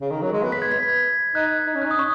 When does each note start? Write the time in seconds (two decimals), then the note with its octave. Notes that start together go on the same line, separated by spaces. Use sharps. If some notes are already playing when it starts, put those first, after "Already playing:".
0.01 C#3
0.11 D#3
0.22 F#3
0.32 G#3
0.43 B3
0.52 B6
0.62 G#6
0.72 B6
0.89 G#6
1.35 D#4 F#6
1.67 D#4
1.75 C#4
1.82 D#4 F#6
1.91 D#6
1.99 C#6